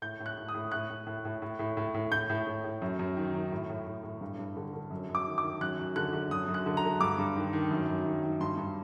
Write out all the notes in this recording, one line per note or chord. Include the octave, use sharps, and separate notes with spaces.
A2 G6
A2
F#6
A2
D#6
A2
A2 F#6
A2
A2
A2
A2
A2
A2
A2
A2 G6
A2
A2
A2
F#2
F#2
D#3
D#3
A2
A2
A2
A2
G2
G2
D3
D3
F#2
F#2
D6
D#3
D6
D#3
F#2 F#6
F#2
D3 F#6
D3
F#2 D#6
F#2
F#6
D3
A#5
D3
G2 D6
G2
D#3
D#3
F#2
F#2
D#3
D#3
G2 C6
G2